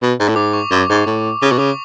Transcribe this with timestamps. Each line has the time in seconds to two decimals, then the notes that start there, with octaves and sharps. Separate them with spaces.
0.02 B2
0.19 G#2
0.29 A2
0.36 G#2 D6
0.53 C#6
0.71 F#2
0.89 G#2
1.06 A2
1.41 C#3 D6
1.51 B2 C#6
1.58 C#3 D6